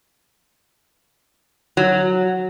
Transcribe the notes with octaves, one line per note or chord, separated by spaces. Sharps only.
F#3